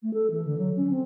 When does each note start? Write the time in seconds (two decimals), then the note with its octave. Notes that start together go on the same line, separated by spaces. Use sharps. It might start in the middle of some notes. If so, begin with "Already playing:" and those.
0.03 A3
0.14 A4
0.31 E3
0.45 D3
0.58 F#3
0.76 C#4
0.90 C4